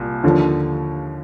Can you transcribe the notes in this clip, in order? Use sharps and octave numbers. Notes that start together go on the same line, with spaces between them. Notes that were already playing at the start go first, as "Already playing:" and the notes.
Already playing: C2 A#2
D#2 D3 F3